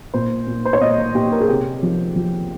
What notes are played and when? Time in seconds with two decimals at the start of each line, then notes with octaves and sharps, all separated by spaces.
0.14 A#2 C5
0.47 A#2
0.65 C5
0.73 C#5
0.81 A#2 D#5
1.15 A#2 G4
1.32 A#4
1.41 G#4
1.49 C3 G4
1.83 F3
2.16 F3